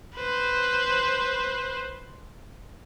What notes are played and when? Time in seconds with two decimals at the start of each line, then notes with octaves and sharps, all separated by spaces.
0.15 B4 C5